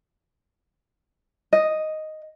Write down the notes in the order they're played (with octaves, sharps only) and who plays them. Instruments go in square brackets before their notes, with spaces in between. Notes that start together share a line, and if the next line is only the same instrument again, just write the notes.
[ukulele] D#5